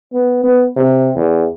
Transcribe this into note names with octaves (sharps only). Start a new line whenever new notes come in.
B3
B3
C3
E2